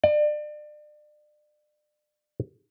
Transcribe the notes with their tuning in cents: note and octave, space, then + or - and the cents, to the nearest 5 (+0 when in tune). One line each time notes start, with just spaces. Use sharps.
D5 +35